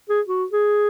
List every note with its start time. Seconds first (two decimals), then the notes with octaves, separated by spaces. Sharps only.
0.09 G#4
0.27 F#4
0.52 G#4